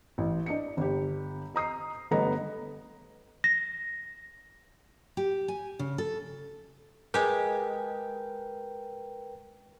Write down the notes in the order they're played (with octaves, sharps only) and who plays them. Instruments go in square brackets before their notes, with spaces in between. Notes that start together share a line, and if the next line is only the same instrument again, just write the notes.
[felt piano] A1
D4 D#5 C#7
G1 G4
D#5 A#5 D#6 C7
G1 G2 A3 B3 D#5 A#5
[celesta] A#6
[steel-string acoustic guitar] G4
G#5
C#3
A4
[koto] G#3 G4 [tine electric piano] A#4 B4 G5